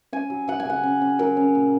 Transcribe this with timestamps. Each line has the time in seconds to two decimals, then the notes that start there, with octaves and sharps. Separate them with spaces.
0.13 C#4 G#5
0.30 F#3
0.48 F#3 F#5
0.60 G#5
0.65 C#3 F#5
0.83 C#4
1.02 C#4
1.19 F#3 A#4
1.37 C#4
1.55 A#2